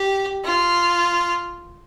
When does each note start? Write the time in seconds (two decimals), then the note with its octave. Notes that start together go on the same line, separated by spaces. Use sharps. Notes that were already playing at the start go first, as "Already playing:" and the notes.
Already playing: G4
0.45 F4